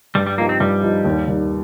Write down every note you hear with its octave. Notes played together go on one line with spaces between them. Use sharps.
G2 G3
G3
F3 A#3 D#4 G4
C4
G2 G3
F3 D#4 G4
D#2
D#3 G3